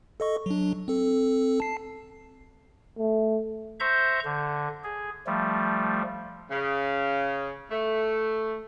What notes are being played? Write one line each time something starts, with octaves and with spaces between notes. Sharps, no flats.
A4 D#5 C#6
F#3 D4
C4 A4
A5 C7
A3
C5 E5 A#5 C#6 G6
D3
G#4
F3 G3 A3
C#3
A3